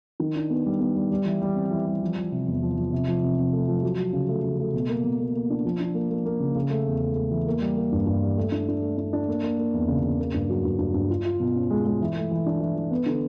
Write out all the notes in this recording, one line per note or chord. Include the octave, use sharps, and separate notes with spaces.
D#3
D4
B3
G3
B3
G3
G3
E3
G3
C4
E3
G3
F3
F3
C3
E2
F3
F3
C3
F3
C3
C3
A3
F3
F#3
F#3
C#3
A3
C#3
A3
B2
A#3
B2
A#3
A#3
D4
F3
D4
A#3
A#3
A#3
C#3
C#3
A3
E2
A3
A3
E3
A#3
G3
A#3
G2
G2
G3
A3
D4
D4
A3
D4
D4
A#3
A#3
A#3
E2
C#3
C#3
A#3
G2
F#3
G2
G2
G2
F4
F4
B2
C#4
G#3
G#3
E3
A3
E3
D4
E3
E3
B3
D3